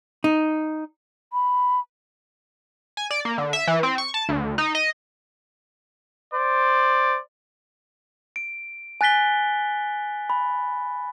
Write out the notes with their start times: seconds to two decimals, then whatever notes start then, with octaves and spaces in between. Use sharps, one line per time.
0.24 D#4
1.33 B5
2.97 G#5
3.11 D5
3.25 A#3
3.38 D3
3.53 E5
3.67 E3
3.83 C4
3.98 C#6
4.14 A5
4.29 D2
4.58 D#4
4.75 D#5
6.34 C5 D5
8.36 D7
9.01 G#5 F#6 A6 B6 G7
10.30 B5